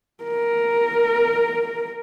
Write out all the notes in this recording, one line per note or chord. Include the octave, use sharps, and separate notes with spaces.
A#4